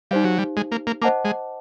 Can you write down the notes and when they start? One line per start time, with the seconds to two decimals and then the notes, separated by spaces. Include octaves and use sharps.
0.11 G3 D#4 G4 C5 F5
0.24 F#3
0.38 G3
0.57 G#3
0.72 A#3
0.87 A#3
1.02 A#3 C5 D#5 F#5 A5 D6
1.25 G#3